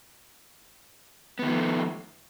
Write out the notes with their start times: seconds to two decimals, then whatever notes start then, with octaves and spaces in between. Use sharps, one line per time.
1.39 B3
1.42 D#3
1.46 F3
1.49 A3